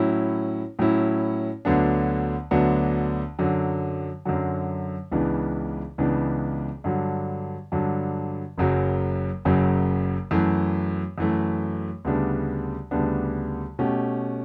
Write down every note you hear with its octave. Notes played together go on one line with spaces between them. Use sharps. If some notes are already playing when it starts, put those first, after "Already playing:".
Already playing: A2 F#3 C#4 E4
A2 F#3 C#4 E4
D2 D3 F#3 B3 D4
D2 D3 F#3 B3 D4
F#2 D3 F#3
F#2 D3 F#3
C#2 C#3 E3 B3 D4
C#2 C#3 E3 B3 D4
G2 D3 F#3
G2 D3 F#3
F#1 F#2 C#3 F#3
F#1 F#2 C#3 F#3
F#2 E3 A3
F#2 E3 A3
D2 C#3 G3 B3 D4
D2 C#3 G3 B3 D4
B2 A3 C#4 G4